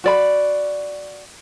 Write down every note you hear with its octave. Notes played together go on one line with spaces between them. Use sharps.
F#4 D5 B5